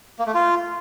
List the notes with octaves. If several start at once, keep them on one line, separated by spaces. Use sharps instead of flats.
A#3
A3
F4